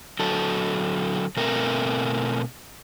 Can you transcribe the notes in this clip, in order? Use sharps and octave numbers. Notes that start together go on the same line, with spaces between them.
D3 F#3 A4
B2 A3 C4 A#4